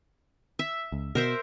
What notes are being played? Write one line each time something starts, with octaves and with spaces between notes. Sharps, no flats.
E5
C#2
B2 A#4 C5 E5